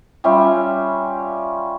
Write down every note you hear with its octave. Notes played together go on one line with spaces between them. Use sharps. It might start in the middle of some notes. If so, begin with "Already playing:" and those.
G3 C#4 F4 E5